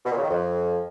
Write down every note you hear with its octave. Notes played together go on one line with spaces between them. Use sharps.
B2
A#2
C#3
D#3
F2